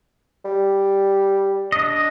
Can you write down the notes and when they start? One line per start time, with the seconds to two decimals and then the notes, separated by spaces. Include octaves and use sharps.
0.45 G3
1.72 D4 D#5